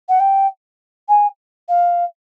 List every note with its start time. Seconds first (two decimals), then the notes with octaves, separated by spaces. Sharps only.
0.09 F#5
0.20 G5
1.09 G#5
1.69 F5